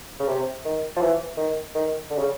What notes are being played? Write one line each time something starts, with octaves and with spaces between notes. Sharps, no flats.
C#3
C3
D#3
F3
E3
D#3
D#3
D3
C#3